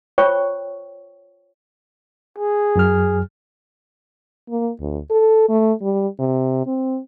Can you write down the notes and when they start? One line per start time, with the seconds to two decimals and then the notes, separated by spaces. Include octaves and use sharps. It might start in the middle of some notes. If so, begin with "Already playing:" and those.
0.18 F4 C5 C#5 G5 C#6
2.38 G#4
2.76 F#2 F#3 F6
4.49 A#3
4.80 D2
5.11 A4
5.49 A3
5.82 G3
6.19 C3
6.67 C4